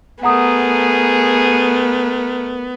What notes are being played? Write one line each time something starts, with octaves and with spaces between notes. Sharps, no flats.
A3 B3 G#4 A#4 F#5 A#5 D#6